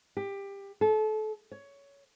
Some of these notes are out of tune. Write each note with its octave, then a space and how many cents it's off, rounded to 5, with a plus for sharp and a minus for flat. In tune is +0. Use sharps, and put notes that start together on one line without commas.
G4 +20
A4 -30
C#5 +15